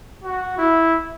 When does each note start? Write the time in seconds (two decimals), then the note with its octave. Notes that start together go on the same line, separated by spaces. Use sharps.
0.24 F#4
0.58 E4